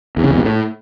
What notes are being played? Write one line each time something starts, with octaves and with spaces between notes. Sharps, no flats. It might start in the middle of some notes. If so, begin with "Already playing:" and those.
E2
C#3
E2
B2
A2